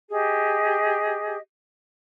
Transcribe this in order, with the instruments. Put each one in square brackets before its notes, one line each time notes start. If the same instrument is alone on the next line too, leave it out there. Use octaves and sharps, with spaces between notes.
[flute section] G4 G#4 D#5